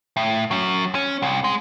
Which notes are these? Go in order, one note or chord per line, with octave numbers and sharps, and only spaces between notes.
A2
F#3 C#4
C#4
C2
G#3